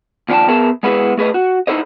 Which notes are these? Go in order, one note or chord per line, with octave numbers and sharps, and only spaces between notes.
D#2 F3 D4 F#5 G5 A5
B3 G#4 A#4 E5 A5
G#3 B3 E4 G#4 B4
A3 G#4 B4 D#5
F#4
D#4 E4 A4 C5 D#5